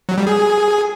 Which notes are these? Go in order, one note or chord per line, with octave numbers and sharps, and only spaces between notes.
F#3
G3
G#4